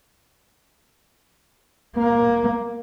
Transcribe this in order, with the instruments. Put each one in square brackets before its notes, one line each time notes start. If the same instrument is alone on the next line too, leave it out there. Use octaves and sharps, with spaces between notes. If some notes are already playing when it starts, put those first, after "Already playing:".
[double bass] A#3